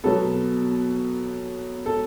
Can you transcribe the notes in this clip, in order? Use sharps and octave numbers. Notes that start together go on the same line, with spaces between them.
B2 F#3 B3 A4
A4